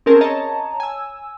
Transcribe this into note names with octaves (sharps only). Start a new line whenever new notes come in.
C4 C#4 G#4 A#4 A5
C#5 D#5 A5 A#5
G#5 E6